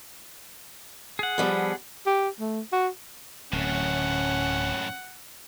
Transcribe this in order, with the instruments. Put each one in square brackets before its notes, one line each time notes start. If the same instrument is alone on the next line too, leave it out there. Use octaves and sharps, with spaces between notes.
[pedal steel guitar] G#4 F#5
[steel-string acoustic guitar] F3 G3 B3
[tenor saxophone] G4
A3
F#4
[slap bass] D1 [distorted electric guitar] F#2 A2 [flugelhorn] C#4 [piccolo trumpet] F#5